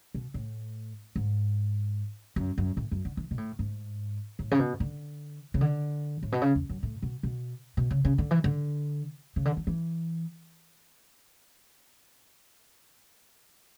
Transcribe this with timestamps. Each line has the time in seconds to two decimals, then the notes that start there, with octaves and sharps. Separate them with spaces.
0.14 B2
0.34 A2
1.16 G#2
2.36 F#2
2.58 F#2
2.77 A2
2.91 F#2
3.05 D3
3.17 E3
3.31 B2
3.38 A2
3.59 G#2
4.39 A2
4.51 C#3
4.59 B2
4.80 D3
5.54 C#3
5.61 D3
6.23 A2
6.32 B2
6.42 C#3
6.55 E2
6.69 F#2
6.83 A2
7.02 B2
7.23 B2
7.77 B2
7.91 C#3
8.05 C#3
8.18 D3
8.31 E3
8.44 D3
9.36 C#3
9.45 D3
9.57 E3
9.67 E3